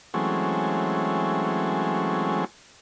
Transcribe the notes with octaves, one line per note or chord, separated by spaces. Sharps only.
E3 F#3 G#3 A3 C4 C#4